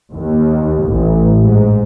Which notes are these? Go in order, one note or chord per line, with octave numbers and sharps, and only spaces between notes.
D#2
A1
G#2